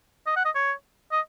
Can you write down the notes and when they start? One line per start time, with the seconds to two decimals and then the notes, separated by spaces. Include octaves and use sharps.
0.27 D#5
0.36 F#5
0.45 D#5
0.55 C#5
1.12 D#5